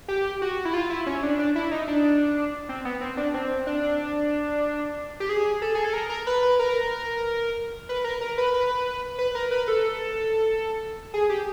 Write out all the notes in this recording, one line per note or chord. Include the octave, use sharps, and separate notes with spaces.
G4
F#4
E4
F4
E4
C#4
D4
D4
E4
D#4
D4
C4
B3
C4
D4
C4
D4
G4
G#4
A4
G#4
A4
A#4
A#4
B4
B4
A#4
B4
A#4
A#4
B4
B4
B4
A#4
B4
A4
G#4
G4